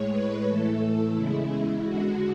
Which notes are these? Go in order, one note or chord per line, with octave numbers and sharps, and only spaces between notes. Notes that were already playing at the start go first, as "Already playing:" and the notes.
Already playing: A2 G#3 C#5
B4
A2 E3 A3 A4
E2 C#3 G#3 E4
E4
E2 D3 G#3 F#4